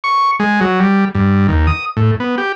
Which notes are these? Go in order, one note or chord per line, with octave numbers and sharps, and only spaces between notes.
C#6
G#3
F#3
G3
G2
D#2
D#6
A2
B3
G4